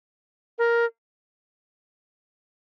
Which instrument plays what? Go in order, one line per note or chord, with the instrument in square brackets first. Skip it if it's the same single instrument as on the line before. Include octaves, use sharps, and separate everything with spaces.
[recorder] A#4